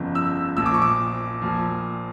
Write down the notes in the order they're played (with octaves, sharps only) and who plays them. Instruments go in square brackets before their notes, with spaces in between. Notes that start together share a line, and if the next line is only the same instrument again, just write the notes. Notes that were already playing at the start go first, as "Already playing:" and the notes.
Already playing: [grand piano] G1 F2 C#3
E6
A#1 A#2 F3 E6
D6
C#6
D6
A#1 A#2 F3